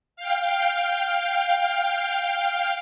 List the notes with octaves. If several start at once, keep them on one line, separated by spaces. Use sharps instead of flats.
F5 G5